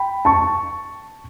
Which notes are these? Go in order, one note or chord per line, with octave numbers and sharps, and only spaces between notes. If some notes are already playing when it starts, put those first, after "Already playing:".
Already playing: G5 B5
A5 C#6